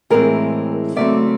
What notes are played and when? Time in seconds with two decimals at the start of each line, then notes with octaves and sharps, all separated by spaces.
0.10 A2 E3 G#3 C4 G#4 A#4
0.96 C#3 F#3 A3 C4 D5 E5